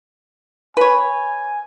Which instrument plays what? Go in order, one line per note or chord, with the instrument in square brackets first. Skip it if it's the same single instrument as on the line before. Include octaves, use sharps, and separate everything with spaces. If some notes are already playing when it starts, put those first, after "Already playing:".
[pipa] B4 C#5 [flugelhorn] G#5